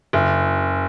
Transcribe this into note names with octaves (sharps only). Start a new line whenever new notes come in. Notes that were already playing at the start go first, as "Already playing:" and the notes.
F#1